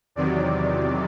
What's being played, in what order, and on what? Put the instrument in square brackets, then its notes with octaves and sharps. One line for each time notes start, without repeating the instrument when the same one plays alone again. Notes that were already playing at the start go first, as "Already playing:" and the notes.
[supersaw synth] E2 C3 D#3 F#3 D5